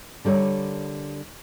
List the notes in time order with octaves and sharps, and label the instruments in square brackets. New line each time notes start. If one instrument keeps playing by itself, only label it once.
[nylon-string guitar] D3 G3 A#4 C#5